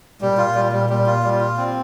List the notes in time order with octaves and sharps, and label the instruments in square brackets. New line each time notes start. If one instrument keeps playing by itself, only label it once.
[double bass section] A#2 [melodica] G3
[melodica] F4
G3
G3
G3
F4
G3
F4
C4